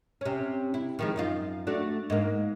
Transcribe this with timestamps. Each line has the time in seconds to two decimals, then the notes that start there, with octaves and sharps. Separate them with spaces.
0.21 C3 C#4
0.74 E4
0.99 D#3 F3 G#3
1.16 F#2 D#4 F4
1.67 A3 D4 F#4
2.10 G#2 A#3